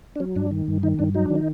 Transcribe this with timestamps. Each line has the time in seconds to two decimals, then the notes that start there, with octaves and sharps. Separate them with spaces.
0.16 D4
0.20 F#3 C#4
0.36 G2 D4
0.51 D#3
0.68 G2
0.83 D#3 D#4
0.99 G2 D4
1.15 F#3 D#4
1.25 D#3 D4
1.35 D#4